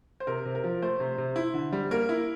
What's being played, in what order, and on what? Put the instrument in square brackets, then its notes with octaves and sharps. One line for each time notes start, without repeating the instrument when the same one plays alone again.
[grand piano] C5
C3 A#4
C3
A#4
F3
A3 C5
C3
C3
E4
D3
G3
A#3 A#4
E4